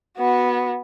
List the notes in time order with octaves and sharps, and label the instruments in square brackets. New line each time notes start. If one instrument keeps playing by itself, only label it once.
[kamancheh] B3 F#4